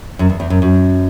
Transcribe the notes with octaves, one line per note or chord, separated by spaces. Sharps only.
F#2
E2
E2
F#2
F#2